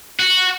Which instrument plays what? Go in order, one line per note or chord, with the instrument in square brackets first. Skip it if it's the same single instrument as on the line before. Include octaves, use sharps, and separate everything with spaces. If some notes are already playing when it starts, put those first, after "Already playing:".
[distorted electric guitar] F#4